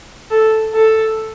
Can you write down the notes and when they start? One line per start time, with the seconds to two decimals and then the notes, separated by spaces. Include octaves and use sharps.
0.31 A4
0.74 A4